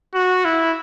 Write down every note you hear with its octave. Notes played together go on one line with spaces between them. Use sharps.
F#4
E4